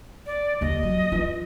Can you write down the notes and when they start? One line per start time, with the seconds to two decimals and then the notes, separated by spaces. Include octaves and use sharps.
0.26 D5
0.61 D#2 D3 D#5
0.83 F#3
1.12 E3 F4